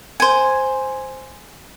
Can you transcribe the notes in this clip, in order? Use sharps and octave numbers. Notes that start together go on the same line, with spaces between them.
C5 G#5